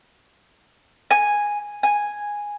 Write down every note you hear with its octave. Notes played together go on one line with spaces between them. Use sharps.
G#5
G#5